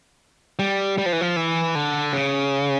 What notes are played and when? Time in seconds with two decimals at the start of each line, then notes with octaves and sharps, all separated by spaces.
0.59 G3
0.98 G3
1.06 F3
1.12 E3
1.21 F3
1.36 E3
1.75 D3
2.13 C#3